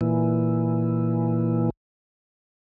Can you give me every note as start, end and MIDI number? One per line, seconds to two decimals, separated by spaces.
0.01 1.70 46
0.01 1.70 52